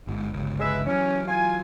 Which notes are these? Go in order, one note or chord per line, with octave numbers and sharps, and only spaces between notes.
G1 G#2
G1 C#2
G#3 B4 E5
E3 F#3 C#4
F4 G#5